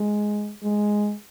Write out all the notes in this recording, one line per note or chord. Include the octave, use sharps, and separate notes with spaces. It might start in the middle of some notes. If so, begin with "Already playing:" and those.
Already playing: G#3
G#3